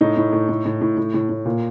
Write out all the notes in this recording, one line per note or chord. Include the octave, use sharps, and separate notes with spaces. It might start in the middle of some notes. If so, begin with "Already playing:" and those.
A2 D#4
A2
A2
A2
A2
A2
A2
A2
A2
A#2